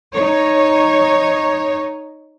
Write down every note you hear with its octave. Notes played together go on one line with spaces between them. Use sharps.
D#4 C#5